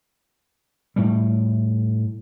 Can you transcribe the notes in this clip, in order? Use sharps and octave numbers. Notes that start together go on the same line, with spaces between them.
A2 G3